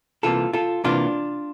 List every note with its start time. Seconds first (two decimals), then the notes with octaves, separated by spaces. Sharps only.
0.23 C2 C3 E3 A#3 F4 A4
0.53 F4 A4
0.84 C2 C3 E3 A#3 D4 F4